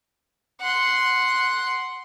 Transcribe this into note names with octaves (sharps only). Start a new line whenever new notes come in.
F#5 C6